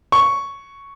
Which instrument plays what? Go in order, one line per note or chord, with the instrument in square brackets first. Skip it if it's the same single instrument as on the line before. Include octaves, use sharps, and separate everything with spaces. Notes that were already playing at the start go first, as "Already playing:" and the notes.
[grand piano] C#6